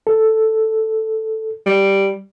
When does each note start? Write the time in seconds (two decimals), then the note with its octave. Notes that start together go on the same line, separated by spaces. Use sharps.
0.07 A4
1.66 G3